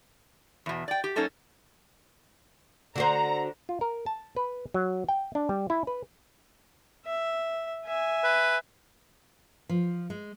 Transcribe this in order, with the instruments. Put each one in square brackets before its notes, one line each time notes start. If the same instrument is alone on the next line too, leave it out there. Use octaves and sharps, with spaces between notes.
[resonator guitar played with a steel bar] E2 B2
D5 G5
G4
F#3 A#3 C#4 D#4 A4 A#4
[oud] D3 F#4 C5 [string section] A#5
[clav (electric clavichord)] F4
A#4
A5
B4
F#3
G5
D4
G3
E4
B4
[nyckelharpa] E5
E5 G#5
[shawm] B4
[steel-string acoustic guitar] F3
G#3